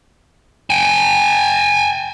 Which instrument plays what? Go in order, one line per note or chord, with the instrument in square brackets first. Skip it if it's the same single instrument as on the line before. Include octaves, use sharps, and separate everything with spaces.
[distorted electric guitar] G5 G#5